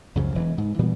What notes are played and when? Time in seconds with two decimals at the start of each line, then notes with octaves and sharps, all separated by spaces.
0.15 C#2 F#2 C#3 F3
0.35 E1 E3
0.58 G#2
0.79 A#2 E3 G3 B3